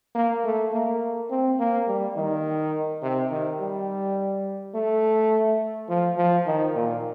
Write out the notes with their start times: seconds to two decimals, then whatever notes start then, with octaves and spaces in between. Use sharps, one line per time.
0.15 A#3
0.44 A3
0.72 A#3
1.30 C4
1.59 A#3
1.87 G3
2.16 D#3
3.02 C3
3.31 D#3
3.60 G3
4.75 A3
5.89 F3
6.17 F3
6.46 D#3
6.75 A#2